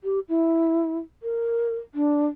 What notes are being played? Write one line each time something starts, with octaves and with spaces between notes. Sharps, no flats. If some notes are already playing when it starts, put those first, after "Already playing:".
G4
E4
A#4
D4